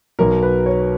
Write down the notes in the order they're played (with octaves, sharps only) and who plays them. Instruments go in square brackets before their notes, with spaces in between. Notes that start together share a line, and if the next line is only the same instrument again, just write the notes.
[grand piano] B1 B2 F#3 A#4
B4
C#5